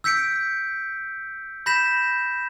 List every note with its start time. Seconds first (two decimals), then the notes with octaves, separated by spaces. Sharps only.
0.04 E6 G6 B6 C#7 D7
1.66 B5 G6 A#6 B6 E7